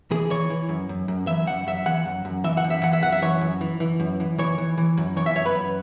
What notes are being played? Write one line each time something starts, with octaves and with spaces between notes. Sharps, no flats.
E3 G#4
E3 C#5
E3
F#2
F#2
F#2
E3 E5
F#2 F#5
F#2 E5
E3 F#5
F#2
F#2
E3 E5
F#5
F#2
E5
E3 F#5
E5
F#2 F#5
E5
E3 C#5
F#2
E3
E3
F#2
E3
E3 C#5
E3
E3
F#2
E3 C#5
E5
F#2 C#5
B4
F#2